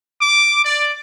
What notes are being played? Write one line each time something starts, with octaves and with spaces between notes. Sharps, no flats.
D6
D5